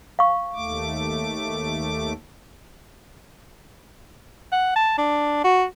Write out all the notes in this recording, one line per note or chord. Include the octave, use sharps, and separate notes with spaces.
F5 C#6
D#2 A3 D6
F#5
A5
D4
F#4